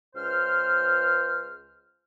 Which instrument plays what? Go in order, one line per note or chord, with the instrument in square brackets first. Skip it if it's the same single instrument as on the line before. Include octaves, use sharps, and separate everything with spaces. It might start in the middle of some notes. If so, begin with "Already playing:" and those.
[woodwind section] C#2 C5 F6